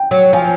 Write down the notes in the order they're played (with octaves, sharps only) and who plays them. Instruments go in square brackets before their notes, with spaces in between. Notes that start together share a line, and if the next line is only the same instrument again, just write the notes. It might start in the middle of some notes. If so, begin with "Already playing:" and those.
Already playing: [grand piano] G5
[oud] F#3
[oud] F3 [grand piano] G#5